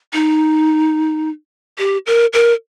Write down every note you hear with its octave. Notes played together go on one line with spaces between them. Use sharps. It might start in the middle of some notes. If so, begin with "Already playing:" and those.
D#4
G4
A#4
A#4